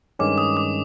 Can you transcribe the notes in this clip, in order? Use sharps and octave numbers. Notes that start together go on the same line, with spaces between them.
G2 D#3 G#3 C#4 D6
D#6
D6